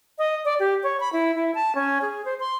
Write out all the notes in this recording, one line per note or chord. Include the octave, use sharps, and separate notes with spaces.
D#5
D5
G4
C#5
B5
E4
E4
A5
C#4
G#4
C5
C6